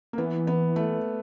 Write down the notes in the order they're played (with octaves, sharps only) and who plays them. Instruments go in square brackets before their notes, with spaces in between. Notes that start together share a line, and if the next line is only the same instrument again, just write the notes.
[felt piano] A#3
[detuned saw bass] E3 [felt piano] B3
[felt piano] B3
A3